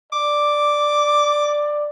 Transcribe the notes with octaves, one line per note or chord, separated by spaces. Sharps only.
D5 D6